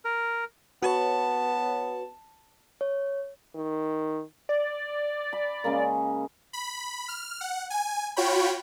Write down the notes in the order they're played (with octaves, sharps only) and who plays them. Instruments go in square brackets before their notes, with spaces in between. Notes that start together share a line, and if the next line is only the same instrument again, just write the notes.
[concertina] A#4
[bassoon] B3 [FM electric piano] F#4 B4 C#5 [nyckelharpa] A5
[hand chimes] C#5
[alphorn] D#3
[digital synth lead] D5
[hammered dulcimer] B5
C#3 G#3 A#3
[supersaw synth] B5
F6
F#5
G#5
F4 F#4 C#5 G5 B5